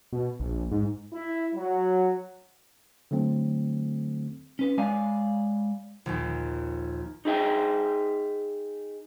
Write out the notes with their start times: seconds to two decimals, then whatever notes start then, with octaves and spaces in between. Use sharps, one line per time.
0.13 B2
0.40 A#1
0.71 G#2
1.13 E4
1.55 F#3
3.11 D3 F#3 A3 C4
4.59 C#4 B4
4.78 G#3 C#5 D5 F5 G#5
6.06 A#1 D#2
7.25 D#4 G#4 E5 G5 G#5